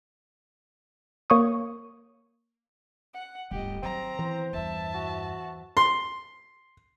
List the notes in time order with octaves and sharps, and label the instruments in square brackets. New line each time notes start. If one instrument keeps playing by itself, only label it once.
[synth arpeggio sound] A#3 C#5 C#6 D#6
[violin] F#5
[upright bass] D1 G1 [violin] G4 D#5
[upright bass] D#3 F#3 [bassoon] C4 [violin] A#5
[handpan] E3 C5
[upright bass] E2 G2 [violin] E5 A5
[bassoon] F#4
[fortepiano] C6